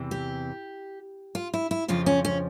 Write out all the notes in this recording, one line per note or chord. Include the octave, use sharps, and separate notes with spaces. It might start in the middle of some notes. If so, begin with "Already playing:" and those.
Already playing: E2 C3 E3
G4
F4
E4
E4
F2 C#3 F3 F4
C#4
C#4